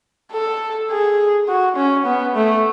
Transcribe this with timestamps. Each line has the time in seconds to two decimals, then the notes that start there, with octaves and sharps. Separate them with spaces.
0.32 A4
0.91 G#4
1.48 F#4
1.76 C#4
2.05 B3
2.35 A3